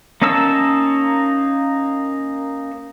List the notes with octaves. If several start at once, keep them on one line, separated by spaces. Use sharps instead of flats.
A#3 C#4 D#4 A5 E6